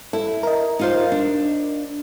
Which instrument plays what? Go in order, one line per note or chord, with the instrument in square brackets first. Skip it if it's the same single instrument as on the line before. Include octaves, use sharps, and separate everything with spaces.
[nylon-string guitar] E4 [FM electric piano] A4
[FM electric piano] A#4 D#5
[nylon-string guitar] D#4 F4 C5
D4